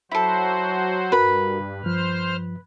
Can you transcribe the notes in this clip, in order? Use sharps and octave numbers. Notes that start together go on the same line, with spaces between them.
F#3 E4 F#4 A4 C5
G2 F#4 A#4 B4 B5
G2 F3 C5 F6